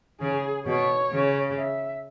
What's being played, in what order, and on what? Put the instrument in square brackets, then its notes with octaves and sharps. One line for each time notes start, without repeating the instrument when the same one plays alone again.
[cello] C#3 [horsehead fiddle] G#4
[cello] B2 [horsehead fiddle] C#5
[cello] C#3
[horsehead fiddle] E5